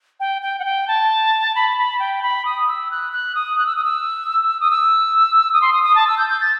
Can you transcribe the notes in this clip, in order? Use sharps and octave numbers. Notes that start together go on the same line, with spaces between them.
G5
G5
F#5
G5
A5
B5
B5
G5
B5
D#6
E6
F#6
F#6
D#6
F#6
E6
D#6
E6
D#6
E6
D#6
C6
D#6
D#6
A5
E6
G6
G6
A6